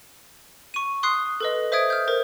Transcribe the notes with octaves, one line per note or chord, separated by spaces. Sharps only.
C#6 D#7
C6 D#6 F#6 C7
A4 B4 D#5
C5 E5 D#6 G#6 D7
F6 G6
A#4 C5